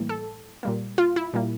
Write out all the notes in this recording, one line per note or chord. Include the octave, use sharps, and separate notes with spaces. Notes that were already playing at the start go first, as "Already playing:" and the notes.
Already playing: A2 E3 G3 A#3
A4
A#2 G3 A#3
F4
E4
A#2 G3 A#3